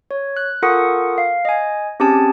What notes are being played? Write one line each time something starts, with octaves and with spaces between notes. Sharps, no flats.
C#5
F#6
F4 A4 A#4 F#5 C#6 D#6
F5
D#5 G#5
C4 C#4 G4 G#4 G#5 A5